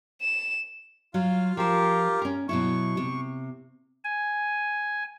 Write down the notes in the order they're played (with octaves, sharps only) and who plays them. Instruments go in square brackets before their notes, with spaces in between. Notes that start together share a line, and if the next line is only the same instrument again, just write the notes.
[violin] E7
[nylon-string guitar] F#3 [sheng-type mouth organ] F4 F5
[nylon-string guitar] F3 C5 [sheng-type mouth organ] F4 G4 A#4
[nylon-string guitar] C#4 A#4
[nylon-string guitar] B2 F#3 E4 [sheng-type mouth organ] C#6
[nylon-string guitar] C3
[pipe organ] G#5